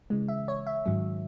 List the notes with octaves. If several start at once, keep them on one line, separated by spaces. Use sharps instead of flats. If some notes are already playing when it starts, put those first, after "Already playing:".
C#3 E3 G#3
E5
C#5
E5
G#2 D#3 F#3 C#4